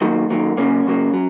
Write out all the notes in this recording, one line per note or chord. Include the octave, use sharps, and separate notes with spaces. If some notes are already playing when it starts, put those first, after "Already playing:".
F#2 D#3 F#3 A#3
F#2 D#3 F#3 A#3
C#2 C#3 F#3 A#3 C#4
C#2 C#3 F#3 A#3
F#3